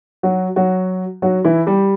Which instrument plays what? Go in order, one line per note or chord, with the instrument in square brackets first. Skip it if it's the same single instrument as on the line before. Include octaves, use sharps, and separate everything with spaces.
[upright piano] F#3 F#4
F#3 F#4
F#3 F#4
E3 E4
G3 G4